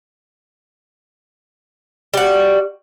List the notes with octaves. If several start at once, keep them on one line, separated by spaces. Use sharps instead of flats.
G3 F#4